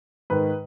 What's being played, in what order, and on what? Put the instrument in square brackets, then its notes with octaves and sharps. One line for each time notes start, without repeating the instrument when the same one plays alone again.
[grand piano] G#2 D#3 B4